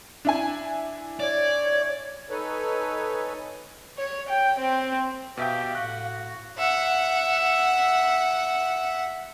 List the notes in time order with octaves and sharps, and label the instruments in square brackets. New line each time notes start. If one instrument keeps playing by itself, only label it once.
[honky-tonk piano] D4 E4 G#5
[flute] C#5 [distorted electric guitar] D5
[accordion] D#4 A4 B4 C#5 G#5
[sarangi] C#5
G5
C4
[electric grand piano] B2 E5 G5 [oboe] G4 [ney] F5
[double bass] A2 [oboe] F#4 [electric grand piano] F#6
[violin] E5 F#5